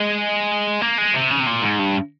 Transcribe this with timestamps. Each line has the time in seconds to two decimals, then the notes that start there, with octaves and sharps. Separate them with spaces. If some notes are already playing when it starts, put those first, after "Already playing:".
Already playing: G#3
0.81 A#3
0.98 G#3
1.14 C3
1.30 C#3
1.40 C3
1.47 A#2
1.62 G#2
1.79 G2